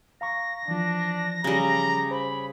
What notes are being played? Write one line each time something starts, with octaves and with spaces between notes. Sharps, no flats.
F5 A#5 C#6 A#6
E3 F3 D4
C#3 G3 A#5
C5 B5